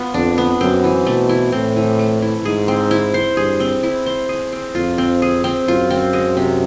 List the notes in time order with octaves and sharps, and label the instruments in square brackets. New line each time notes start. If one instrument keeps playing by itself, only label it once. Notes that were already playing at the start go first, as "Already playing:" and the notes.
Already playing: [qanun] B3 F4
[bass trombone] F2 [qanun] D4
[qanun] B3
[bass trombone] F#2 [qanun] C4
[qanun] E3
[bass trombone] B2 [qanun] A3
[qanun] E4
[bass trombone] A2 [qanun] C4
[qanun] E3
A3
E4
[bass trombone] G#2 [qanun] G#4
[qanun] C4
E4
C5
[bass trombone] G2 [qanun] G#4
[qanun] C4
E4
C5
G#4
C4
[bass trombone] F2 [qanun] F4
[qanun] C4
G#4
C4
[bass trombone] F#2 [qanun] F4
[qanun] C4
G#3
C3